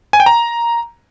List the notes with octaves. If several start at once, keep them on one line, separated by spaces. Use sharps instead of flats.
G#5
G5
A#5